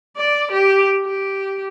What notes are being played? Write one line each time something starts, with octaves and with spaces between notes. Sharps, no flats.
D5
G4
G4